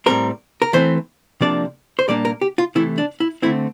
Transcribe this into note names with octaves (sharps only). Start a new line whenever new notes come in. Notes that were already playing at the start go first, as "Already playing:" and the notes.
A2 G3 C4 A#4
A#4
E3 A3 C4 C5
C3 F3 A#3 D4 D5
C5
A#2 G3 A#3 D4 D5
A#4
G4
F4
C3 E3 A3 E4
D4
E4
D3 A3 C4 E4